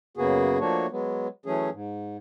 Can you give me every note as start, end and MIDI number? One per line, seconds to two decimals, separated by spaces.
0.17 0.58 42
0.17 0.58 49
0.17 0.58 58
0.17 0.58 59
0.17 0.58 66
0.17 0.58 68
0.60 0.87 53
0.60 0.87 57
0.60 0.87 58
0.60 0.87 62
0.60 0.87 66
0.60 0.87 73
0.91 1.27 54
0.91 1.27 56
0.91 1.27 59
1.46 1.70 52
1.46 1.70 54
1.46 1.70 57
1.46 1.70 61
1.46 1.70 68
1.73 2.17 44